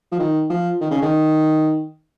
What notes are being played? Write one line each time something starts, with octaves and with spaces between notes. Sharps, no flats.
F3
D#3
F3
D#3
C#3
D#3